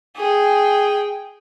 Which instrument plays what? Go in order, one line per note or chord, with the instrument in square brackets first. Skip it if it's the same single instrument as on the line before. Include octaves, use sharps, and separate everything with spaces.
[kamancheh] G#4 G5